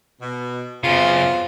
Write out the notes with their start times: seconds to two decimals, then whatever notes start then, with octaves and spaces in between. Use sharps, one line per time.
0.20 B2
0.84 F#2 C#3 B3 C4 F4